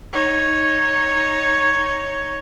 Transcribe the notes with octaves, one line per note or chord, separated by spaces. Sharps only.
D#4 C#5